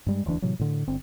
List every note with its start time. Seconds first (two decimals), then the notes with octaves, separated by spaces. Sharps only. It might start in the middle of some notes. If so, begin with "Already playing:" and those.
0.06 G2 G3 G#3
0.26 E1 D2 E3 D4
0.42 A2 C3 E3 F#3
0.59 A2 D3
0.87 G1 D3 C4